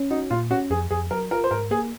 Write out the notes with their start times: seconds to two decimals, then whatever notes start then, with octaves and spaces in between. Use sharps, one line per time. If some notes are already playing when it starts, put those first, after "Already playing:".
Already playing: C#4
0.11 D#4 F#4
0.31 A#2 F4
0.51 C#4 F#4
0.70 F2 G#4
0.91 F2 G#4
1.11 F#3 A#4
1.31 F4 A#4
1.44 C5
1.51 G#2 A#4
1.71 A#3 G#4